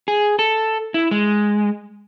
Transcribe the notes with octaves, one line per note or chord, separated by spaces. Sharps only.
G#4
A4
E4
G#3